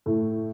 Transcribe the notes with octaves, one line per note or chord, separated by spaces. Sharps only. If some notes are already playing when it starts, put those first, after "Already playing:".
A2 A3